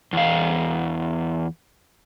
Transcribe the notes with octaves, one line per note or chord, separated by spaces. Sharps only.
E2 F5